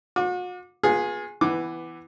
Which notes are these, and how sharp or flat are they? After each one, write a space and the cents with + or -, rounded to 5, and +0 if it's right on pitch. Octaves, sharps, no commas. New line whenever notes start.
F#4 -40 D6 +0
B3 -10 F4 +35 G#4 +0
E3 +0 B3 +20 D6 +0